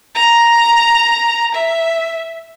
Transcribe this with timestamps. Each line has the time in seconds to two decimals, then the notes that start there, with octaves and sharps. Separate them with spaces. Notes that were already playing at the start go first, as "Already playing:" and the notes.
0.15 A#5
1.55 E5